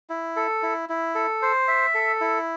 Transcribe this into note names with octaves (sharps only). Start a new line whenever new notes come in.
E4
A4
E4
E4
A4
C5
E5
A4
E4